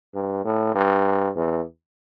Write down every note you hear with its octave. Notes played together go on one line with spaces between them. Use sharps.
G2
A2
G2
E2